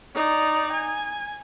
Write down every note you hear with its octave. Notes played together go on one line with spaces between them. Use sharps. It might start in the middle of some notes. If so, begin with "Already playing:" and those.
D#4 D5
G#5